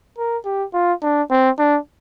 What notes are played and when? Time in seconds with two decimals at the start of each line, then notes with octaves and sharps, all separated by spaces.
0.18 A#4
0.45 G4
0.74 F4
1.02 D4
1.30 C4
1.59 D4